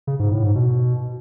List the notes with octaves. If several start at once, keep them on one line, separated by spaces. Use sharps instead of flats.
C#3
G#2
A2
G#2
B2